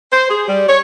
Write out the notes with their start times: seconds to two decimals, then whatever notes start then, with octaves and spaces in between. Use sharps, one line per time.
0.12 C5
0.29 G#4
0.47 G3
0.68 C#5